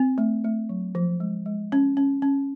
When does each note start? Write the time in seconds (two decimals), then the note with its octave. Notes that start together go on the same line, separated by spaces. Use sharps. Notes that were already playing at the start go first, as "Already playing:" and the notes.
Already playing: C4
0.18 A3
0.44 A3
0.69 F#3
0.95 F3
1.20 G#3
1.46 G#3
1.72 C#4
1.97 C#4
2.22 C#4